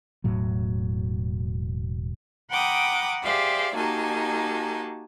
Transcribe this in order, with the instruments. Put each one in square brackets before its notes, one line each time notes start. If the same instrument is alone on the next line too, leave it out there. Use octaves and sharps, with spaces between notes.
[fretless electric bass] E1 A2 F#3
[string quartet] F#5 G5 A#5 B5 D6 D#6
G4 G#4 C5 D5 E5 F5
A#3 D#4 F#4 G4 G#5 A5